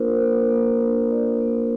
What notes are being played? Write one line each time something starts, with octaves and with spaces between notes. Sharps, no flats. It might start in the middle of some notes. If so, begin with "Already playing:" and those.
Already playing: A#3 D4 F4 A#4 C5
A#3
A#3
D4
F4 D5
A#3